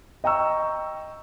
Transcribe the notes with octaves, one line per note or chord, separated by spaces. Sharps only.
D#5 G5 A#5 C#6 E6